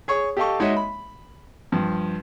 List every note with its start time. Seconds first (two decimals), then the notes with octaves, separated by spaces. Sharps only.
0.08 G#4 C#5 C#6
0.37 G4 A4 D#5 F5 A5 C#6
0.60 G#3 D#4 F#4 C#5 D#5 E5
0.77 B5
1.72 G2 F3